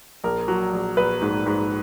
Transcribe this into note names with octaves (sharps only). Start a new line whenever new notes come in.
A#1 A#4
F#3
A#1
A#1 B4
G#2
G#2